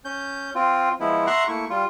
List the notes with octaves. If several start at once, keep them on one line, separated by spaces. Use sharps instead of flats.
C#4 G6
C4 F4
F3 G#3 B3 E4
E5 F#5 A#5 C6 C#6 F#6
A3 A#3 E4 C#6
G3 F4